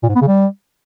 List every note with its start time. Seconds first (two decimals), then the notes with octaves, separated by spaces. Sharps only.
0.03 A#2
0.09 G#2
0.15 B3
0.21 C#3
0.28 G3